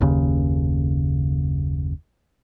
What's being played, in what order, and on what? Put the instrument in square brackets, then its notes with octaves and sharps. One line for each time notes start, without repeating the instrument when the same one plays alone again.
[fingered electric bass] F#1 D#2 C#3